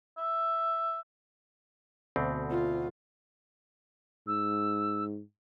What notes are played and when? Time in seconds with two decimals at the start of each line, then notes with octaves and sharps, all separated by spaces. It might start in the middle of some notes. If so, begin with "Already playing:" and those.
0.17 E5
2.16 D2 B2 C4
2.51 F4
4.27 G#2 E6